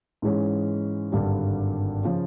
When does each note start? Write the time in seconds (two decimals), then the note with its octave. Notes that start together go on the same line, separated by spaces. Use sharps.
0.22 G#2 E3 G#3 C#4
1.12 G#1 G2 D3 G3
2.04 C#3 F3